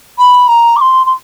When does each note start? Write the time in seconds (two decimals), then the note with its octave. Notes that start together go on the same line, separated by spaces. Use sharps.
0.18 B5
0.48 A#5
0.76 D6
0.81 C6
1.06 C6